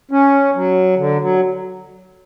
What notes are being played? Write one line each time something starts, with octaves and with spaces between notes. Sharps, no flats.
C#4
F#3
D3
F#3